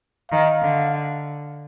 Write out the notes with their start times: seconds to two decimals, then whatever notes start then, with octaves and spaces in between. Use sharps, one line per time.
0.31 D#3 F5
0.62 D3